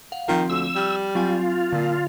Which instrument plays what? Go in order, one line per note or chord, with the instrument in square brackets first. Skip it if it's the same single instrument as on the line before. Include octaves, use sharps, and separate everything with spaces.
[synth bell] F5 F#5
[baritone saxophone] D#3 [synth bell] F3 C4 F4
[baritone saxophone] D2 [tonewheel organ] E6
[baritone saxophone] G3 [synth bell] F6 G6 E7
[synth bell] F#3 C4 G#5 [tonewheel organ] F4
[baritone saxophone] A#2 [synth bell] D3